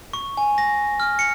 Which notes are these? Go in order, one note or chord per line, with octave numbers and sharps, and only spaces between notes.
C#6
G#5
A#6
F6
C#7